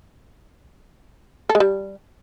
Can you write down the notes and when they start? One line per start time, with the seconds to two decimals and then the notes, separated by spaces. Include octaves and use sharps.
1.49 A4
1.55 G#3
1.60 G3